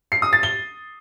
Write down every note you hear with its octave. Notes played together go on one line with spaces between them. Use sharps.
C7
D#6
A6
G7